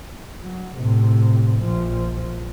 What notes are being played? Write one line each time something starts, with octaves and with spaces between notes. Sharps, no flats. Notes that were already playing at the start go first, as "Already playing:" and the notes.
F#3
A2 C3
A#1 F3